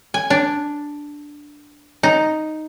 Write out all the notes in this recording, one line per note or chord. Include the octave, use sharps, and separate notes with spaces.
G#5
D4
D#4